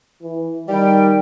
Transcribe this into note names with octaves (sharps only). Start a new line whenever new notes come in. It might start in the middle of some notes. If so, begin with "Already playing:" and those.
E3
D#3 G3 G5